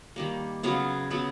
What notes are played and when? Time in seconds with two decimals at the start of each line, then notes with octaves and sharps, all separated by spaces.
0.16 D#3 G3 A#3
0.63 C#3 F#3 B3 F5
1.11 C#3 F#3 B3